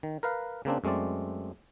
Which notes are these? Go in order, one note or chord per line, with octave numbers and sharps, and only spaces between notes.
D#3
A#4 B4 F5
C#3 A#3 C4 D4
F#2 G#3 A3 C4 D5